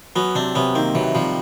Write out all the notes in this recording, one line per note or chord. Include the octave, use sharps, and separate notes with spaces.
F#3 B3 C#4
C3 C4 D4
C3 B3 C#4
D#3 A#3 C4
C3 E3 F#3
C3 F3 G3